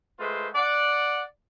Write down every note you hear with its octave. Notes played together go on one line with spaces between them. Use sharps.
G#3 A3 F4 B4 C5
D5 F#5